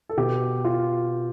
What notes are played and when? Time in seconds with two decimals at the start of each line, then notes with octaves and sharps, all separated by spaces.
0.09 A4
0.17 B2 G4
0.64 F4